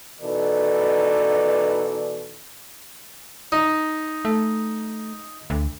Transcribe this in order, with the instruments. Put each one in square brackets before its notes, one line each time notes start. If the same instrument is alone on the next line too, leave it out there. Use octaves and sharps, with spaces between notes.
[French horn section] B2 E3 D#4 A4 D5
[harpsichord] D#4
[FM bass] A3
D2